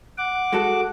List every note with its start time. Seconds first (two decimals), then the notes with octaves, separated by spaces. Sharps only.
0.18 F#5 D6
0.52 G#3 F#4 A4